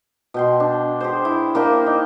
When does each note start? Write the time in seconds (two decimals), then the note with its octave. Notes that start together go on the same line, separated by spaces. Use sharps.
0.34 B2 G5 C6
0.60 D4
1.00 G4 G#4 C5
1.25 E4
1.55 A#3 D4 G4 G5
1.86 D#4